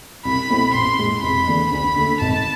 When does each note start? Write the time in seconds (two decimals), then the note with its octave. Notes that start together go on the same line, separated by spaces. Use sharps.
0.25 C2 B5
0.50 B2 A3 C4 E4
0.74 A1 C6
0.98 A2 G#3
1.23 F1 B5
1.48 E2 D3 A3 D4
1.72 D2 B5
1.96 D3 A3
2.21 G#1 A5